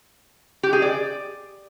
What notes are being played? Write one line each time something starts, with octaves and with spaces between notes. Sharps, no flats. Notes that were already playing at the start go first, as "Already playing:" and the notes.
G4
G#4
D5